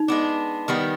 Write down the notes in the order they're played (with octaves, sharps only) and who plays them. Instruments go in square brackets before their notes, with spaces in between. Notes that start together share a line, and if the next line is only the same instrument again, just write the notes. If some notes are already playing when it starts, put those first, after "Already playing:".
Already playing: [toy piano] D#4
[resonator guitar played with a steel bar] G#3 B3 D4
D#3 G3 B3